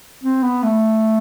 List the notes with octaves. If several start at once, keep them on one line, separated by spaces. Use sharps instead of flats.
C4
B3
A3